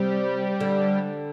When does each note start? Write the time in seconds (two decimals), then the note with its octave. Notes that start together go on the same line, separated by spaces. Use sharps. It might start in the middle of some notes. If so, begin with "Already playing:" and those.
Already playing: C3 G3
0.60 D3